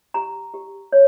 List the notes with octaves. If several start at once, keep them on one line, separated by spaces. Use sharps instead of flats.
G4 A#5
G4
C#5